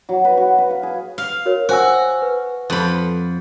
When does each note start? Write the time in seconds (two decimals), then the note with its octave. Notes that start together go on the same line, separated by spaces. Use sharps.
0.09 F#3
0.24 B4
0.37 F#4
0.58 B4
0.71 F5
0.83 G#4
1.18 F5
1.46 F#4 A#4 C#5
1.69 F#4 C5 G#5 E6
2.22 B4
2.70 F2 B5